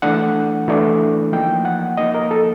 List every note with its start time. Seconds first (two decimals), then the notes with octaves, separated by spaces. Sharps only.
0.02 E3 A3 D4 F#5
0.68 E3 A3 D4
1.32 F3 A#3 D#4 G5
1.65 F#5
1.97 F3 A#3 D#4 D#5
2.15 A#4
2.31 A4